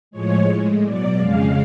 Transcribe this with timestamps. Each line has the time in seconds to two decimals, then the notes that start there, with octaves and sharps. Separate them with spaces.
0.11 A2 F3 G#3 C#5
0.47 A2 G#3
0.82 B2 F#3 D5
1.17 F2 C#3 G#3 F5